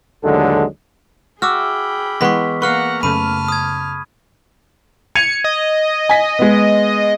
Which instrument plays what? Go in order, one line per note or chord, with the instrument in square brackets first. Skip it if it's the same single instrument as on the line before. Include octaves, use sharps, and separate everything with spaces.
[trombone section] A1 D#2 D3 F#3 G#3 A4
[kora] F#4 E5 [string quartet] G#4 G5 B5 [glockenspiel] D6 E6 F6
[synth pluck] E3 [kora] G#3 B3 [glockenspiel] C#6 B6
[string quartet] A#3 F#5 A#6 [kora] B4 F5 [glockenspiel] C#6 F6 F7
[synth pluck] F#2 C#3 A3 [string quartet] A5 F6 [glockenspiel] B5 D#7
[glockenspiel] D#6 G#6
[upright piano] G#6 D#7 F7 [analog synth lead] C#7
[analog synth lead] D#5
[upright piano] G#5 B6
G#3 B3